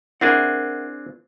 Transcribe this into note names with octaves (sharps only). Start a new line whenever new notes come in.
C4 D4 E4 G#4 A#4 F#5